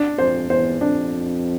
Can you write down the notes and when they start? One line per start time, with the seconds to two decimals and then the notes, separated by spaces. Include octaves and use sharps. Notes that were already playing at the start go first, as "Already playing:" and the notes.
Already playing: D4
0.18 F2 C5
0.50 E2 C5
0.81 F2 D4